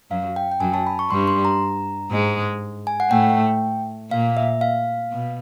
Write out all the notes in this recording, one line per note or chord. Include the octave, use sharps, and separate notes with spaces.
F#2 F#3 F5
G5
G5
F#2 F#3 G#5
A5
B5
C#6
G2 G3 C6
C6
A#5
G#2 G#3
G#5
F#5
A2 A3 G5
A#2 A#3 F5
E5
F5
B2